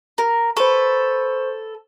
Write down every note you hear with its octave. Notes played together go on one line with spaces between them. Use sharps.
A#4
A4 B4 C5 C#6